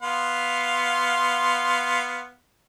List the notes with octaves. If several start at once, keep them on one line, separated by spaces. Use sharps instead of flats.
B3 F5 C6